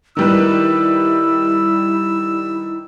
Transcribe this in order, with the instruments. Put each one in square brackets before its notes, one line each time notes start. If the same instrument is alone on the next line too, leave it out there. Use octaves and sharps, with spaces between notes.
[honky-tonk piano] D#3 G3 B4 [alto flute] E4 [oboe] E6